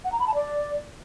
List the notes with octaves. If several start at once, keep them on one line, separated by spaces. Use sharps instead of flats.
F#5
A#5
B5
A5
D5